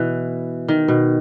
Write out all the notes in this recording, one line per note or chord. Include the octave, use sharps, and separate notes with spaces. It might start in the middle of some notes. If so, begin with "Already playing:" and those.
Already playing: B2 E3
D#3
B2